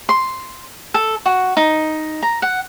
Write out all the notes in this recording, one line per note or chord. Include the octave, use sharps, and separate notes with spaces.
C6
A4
F#4
D#4
A#5
F#5